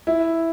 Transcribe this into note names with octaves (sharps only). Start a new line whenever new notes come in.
E4